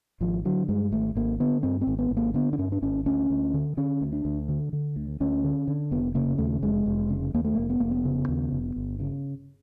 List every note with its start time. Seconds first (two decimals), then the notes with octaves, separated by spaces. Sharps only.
0.20 G#1 F3
0.45 D3 F#3
0.69 G2 G#3
0.92 G#1 A3
1.15 G#1 A#3
1.40 D3 B3
1.63 G2 C4
1.81 C4
1.87 G#1
1.99 B3
2.11 G#1
2.17 A#3
2.34 D3 B3
2.53 D4
2.58 G2 C#4
2.72 D4
2.82 G#1 C#4
3.06 D2 C#4
3.30 D2
3.54 D3
3.77 D3 C#4
4.01 D2
4.12 D4
4.25 D2
4.49 D3
4.73 D3
4.96 D2
5.20 D2 C#4
5.44 D3
5.68 D3
5.91 F1 B3
6.15 C#3 A#3
6.38 D#2 A3
6.62 F1 G#3
6.86 F1
7.10 C#3
7.34 D#2 A#3
7.45 A3
7.55 F1 A#3
7.70 B3
7.80 F1 A#3
7.91 B3
8.05 C#3
8.28 D#2
8.52 F1
8.76 G1
9.00 C#3